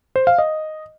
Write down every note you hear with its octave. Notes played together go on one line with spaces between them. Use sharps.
C5
F5
D#5